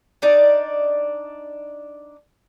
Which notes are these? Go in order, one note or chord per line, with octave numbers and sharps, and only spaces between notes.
D4 D#4 D5